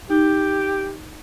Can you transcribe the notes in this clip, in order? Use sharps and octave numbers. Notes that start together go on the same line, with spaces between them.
D#4 G4